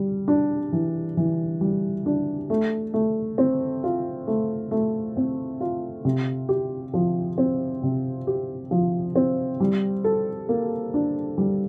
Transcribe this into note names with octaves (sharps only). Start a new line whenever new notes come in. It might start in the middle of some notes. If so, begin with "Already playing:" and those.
Already playing: G3
D4
E3
E3
G3
D4
A3
A3
C4
F4
A3
A3
C4
F4
C3
G4
F3
C4
C3
G4
F3
C4
G3
A4
A#3
D4
G3